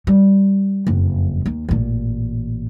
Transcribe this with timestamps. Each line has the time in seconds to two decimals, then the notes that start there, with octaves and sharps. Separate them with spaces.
0.07 G3
0.87 F#1 F2
1.46 D#2
1.69 A1 A#2